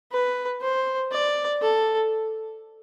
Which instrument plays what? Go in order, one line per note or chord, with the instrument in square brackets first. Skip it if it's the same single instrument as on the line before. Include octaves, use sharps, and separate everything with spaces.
[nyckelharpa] B4
C5
D5
A4